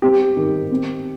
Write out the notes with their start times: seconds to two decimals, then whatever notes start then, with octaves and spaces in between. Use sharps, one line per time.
0.02 C4 G4
0.37 D#3
0.71 C4